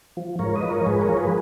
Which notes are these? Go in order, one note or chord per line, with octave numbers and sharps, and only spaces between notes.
F3
G#2 A#4 C#5
B4 D#5
F3
A#4 C#5
G#2 G#4 B4
A#4 C#5
F3
G#4 B4